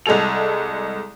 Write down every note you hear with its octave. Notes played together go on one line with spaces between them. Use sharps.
C2 G#3 G#4 A4 F7